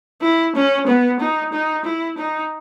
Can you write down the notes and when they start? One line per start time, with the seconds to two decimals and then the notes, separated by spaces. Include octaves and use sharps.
0.21 E4
0.55 C#4
0.87 B3
1.20 D#4
1.53 D#4
1.85 E4
2.18 D#4